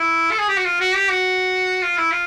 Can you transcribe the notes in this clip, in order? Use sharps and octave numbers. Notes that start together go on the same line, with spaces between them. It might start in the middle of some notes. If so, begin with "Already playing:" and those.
Already playing: E4
A4
G#4
G4
F#4
F4
F#4
G4
F#4
F4
E4
F4